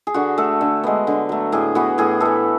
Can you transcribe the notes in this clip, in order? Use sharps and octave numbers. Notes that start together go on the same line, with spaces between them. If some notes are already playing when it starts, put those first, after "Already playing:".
G#4
D3 F#4
A3 A4
D3
G#3 B3
D3
F#3 A3
A2 G#4
E3 B3 F#4
A2 G#4
E3 A3 A4